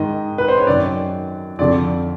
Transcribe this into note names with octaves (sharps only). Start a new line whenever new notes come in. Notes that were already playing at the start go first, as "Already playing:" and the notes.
Already playing: G#2 D#3 D#5
B4
C5
C#5
F#2 D#3 D5
F2 D3 F3 D5